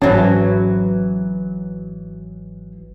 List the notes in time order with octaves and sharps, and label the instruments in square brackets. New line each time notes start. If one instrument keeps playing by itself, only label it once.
[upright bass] G#1 [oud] E3 F#3 [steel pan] C#4 A5